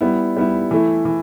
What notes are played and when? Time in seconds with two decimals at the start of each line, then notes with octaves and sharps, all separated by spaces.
0.01 G3 B3 E4
0.37 G3 B3 E4
0.71 E3 A3 E4
1.05 E3